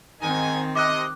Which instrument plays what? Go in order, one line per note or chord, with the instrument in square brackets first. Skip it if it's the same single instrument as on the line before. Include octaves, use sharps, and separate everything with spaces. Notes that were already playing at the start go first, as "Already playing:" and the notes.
[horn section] G#2 D#4 G#5 [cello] D#3 C4
[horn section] C3 D#5 [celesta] D6 F#6